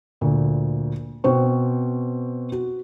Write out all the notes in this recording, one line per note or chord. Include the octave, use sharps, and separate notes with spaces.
D2 A#2
B2 C4 C5 C#6
F#4